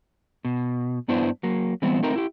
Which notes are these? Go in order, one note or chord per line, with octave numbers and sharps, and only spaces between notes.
B2
G2 B3 D4 E4 C5
F#3 A#3
E3 G3 B3 C4
A3 C4 D#4 A#4
E4 G4